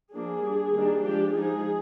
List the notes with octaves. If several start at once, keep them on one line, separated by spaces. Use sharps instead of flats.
F3 A#3 D4 G#4
G3 D4
D#3 G3 A#3 D4
F3 G#3 D4 G4
F3 G#3 D#4 G#4